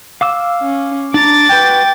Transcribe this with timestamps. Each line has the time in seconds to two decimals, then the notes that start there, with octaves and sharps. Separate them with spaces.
0.21 F5 D6 E6
0.61 C#4
1.14 D4 A#5 D6 A6
1.49 F#4 B4 G5